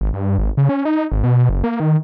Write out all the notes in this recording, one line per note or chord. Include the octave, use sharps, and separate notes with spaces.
G#1
G2
G#1
C#3
C#4
D#4
G#1
B2
F#1
A#3
D#3